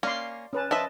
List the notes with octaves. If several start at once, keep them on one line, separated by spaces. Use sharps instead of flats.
A#3 C#4 D5 F5 C6
C#4 B4 A5
F3 B4 D#5 E5 A5